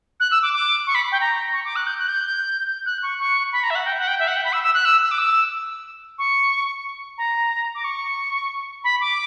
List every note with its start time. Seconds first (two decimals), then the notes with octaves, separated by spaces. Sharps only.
0.19 F#6
0.31 E6
0.42 D6
0.52 D6
0.86 C#6
0.94 B5
1.11 G5
1.20 A#5
1.52 C#6
1.64 D6
1.75 F#6
1.86 G6
1.97 F#6
2.08 G6
2.85 F#6
3.02 C#6
3.19 C#6
3.52 B5
3.63 A#5
3.70 E5
3.75 F#5
3.85 G5
3.98 F#5
4.07 G5
4.19 E5
4.27 F#5
4.36 G5
4.44 B5
4.52 E6
4.62 E6
4.73 F#6
4.85 E6
5.02 E6
5.11 D6
5.18 E6
6.18 C#6
7.17 A#5
7.74 D6
7.84 C#6
8.83 B5
9.00 D6